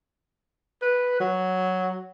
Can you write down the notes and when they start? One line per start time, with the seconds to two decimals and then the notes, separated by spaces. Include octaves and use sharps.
0.82 B4
1.20 F#3